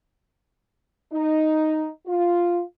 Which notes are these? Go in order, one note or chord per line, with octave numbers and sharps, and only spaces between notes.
D#4
F4